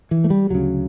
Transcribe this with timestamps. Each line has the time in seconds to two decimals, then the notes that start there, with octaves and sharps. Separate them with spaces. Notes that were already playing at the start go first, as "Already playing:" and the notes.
0.11 E3
0.24 A3
0.30 G3
0.50 D2 C#3 F#3